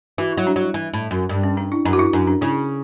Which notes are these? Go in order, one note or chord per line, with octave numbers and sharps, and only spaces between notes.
E3 F#4
E4
F#3
D4
F#3 E4
E3
A2
F#2
G2
C#4
D4
E4
F#2 D4
F#4
E4
F#2 D4
D4
C#3 E4